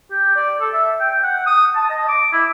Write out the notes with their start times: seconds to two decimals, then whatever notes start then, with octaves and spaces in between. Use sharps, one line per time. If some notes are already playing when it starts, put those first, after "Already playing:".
0.11 G4
0.36 D5
0.61 A4
0.74 E5
1.00 G5
1.24 F#5
1.47 D#6
1.75 A5
1.90 D#5
2.09 D6
2.33 E4